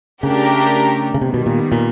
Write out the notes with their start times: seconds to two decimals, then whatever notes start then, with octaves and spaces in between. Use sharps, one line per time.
0.23 C#3 A3 D4 G4 A#4
1.14 C#3
1.21 C3 D#3 G3 B3
1.34 B2
1.46 A#2
1.72 A#2